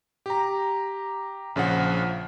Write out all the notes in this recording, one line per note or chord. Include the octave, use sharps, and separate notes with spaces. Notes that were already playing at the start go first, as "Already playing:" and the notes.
G4 A#5
A#1 C#3 F3 F#5